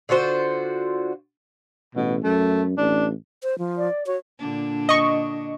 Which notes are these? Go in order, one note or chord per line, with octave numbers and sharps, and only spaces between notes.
D3 F4 F#4 C5
A1 B2
F#2 A3
A1 D4
C5
F3
D5
F#4 C#5
A#2 D3 D4
D#5 C#6